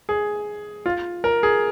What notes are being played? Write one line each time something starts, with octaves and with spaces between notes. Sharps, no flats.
G#4
F4
A#4
G#4